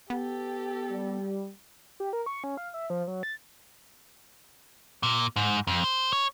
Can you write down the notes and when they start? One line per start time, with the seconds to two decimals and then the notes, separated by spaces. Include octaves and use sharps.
0.10 B3 G4 A4
0.90 G3
2.00 G4
2.13 A#4
2.26 C#6
2.44 C#4
2.57 F5
2.74 E5
2.90 F3
3.07 F#3
3.23 A6
5.03 A#2
5.36 G#2
5.67 F2
5.84 C5
6.13 C#5